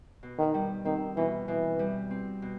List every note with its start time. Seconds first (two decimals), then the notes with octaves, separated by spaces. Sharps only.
0.23 B2
0.39 D#3
0.54 G3
0.85 D#3 C4
1.17 B2 E3
1.48 B2 E3
1.79 G3
2.11 C4
2.42 B2